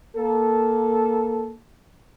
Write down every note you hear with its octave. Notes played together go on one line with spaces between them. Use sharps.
A#3 A4